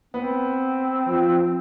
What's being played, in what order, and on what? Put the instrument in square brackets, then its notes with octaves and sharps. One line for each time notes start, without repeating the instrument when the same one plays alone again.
[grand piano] B3 [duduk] C4
[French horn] F3